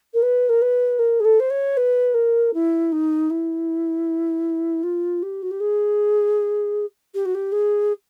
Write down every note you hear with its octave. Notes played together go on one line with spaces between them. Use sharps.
A#4
B4
A#4
B4
A#4
G#4
A4
C5
C#5
B4
A#4
E4
D#4
E4
F4
G4
F#4
G4
G#4
G4
F#4
G4
G#4